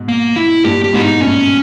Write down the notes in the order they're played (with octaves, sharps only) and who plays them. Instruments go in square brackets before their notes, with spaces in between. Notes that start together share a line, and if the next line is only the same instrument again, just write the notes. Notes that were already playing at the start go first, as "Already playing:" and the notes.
Already playing: [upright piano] G#2 B2
[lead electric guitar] A#3
E4
[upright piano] G2 A#2 [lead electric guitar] G4
[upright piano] A#2 [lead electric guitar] G4
[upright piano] G#2 B2 [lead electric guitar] E4
[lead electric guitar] D#4
[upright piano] G2 A#2 [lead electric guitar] C#4